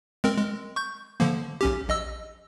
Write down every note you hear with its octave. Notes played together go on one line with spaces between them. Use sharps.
G#3 C4 A#4
G#3
C#6 G6
D3 F3 A#3
B1 C#4 G4
A#1 D#5 E6